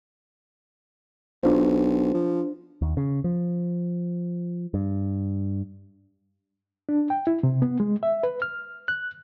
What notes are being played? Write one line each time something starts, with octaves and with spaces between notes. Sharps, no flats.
B1 D4 F4 C5
F3
D#2
C#3
F3
G2
D4
G5
E4
C3
B3
G#3
E5
B4
F6
F#6